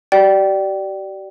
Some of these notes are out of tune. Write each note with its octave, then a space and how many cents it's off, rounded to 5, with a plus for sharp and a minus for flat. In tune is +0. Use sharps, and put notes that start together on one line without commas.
G4 -45 D5 +0 G5 -25